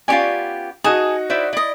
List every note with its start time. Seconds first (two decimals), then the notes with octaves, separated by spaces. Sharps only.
0.08 B3 C#4 F4 G4 D5 G#5
0.84 D#4 F#4 G#4 G#5 A5
1.30 E4 C5 D5 E5
1.53 E4 D5 D#5